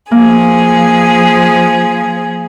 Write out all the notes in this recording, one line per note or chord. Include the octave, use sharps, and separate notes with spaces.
F3 A#3 G#4